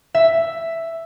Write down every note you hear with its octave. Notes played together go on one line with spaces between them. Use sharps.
E5